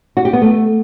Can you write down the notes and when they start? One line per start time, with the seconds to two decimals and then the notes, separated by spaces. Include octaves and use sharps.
0.17 F#4
0.25 G4
0.33 B3
0.42 A3